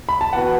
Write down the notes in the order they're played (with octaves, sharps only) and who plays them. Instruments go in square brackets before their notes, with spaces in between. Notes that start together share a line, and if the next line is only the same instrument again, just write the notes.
[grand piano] B5
A5
[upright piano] E3 B3 F#4 B4 [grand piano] F#5